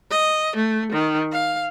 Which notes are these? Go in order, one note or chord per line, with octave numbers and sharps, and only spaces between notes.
D#5
A3
D#3
F5